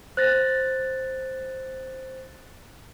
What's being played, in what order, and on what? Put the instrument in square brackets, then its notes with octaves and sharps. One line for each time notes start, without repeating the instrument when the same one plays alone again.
[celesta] C5 [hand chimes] F#6 A6 A#6